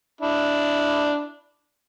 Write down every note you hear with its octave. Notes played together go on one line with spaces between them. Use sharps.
D4 E4